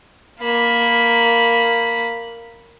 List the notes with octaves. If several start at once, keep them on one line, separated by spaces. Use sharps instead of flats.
A#3 B5